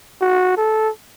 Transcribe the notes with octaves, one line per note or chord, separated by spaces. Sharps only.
F#4
A4